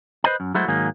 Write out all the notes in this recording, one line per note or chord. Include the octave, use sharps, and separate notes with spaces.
B4 C5 D#5 A5
F#2
F#3 G#3 A3 E4 F#4 C5
G#2 D#3 F#3 A#3 G#4